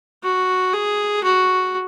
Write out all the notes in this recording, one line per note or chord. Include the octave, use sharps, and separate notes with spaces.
F#4
G#4
F#4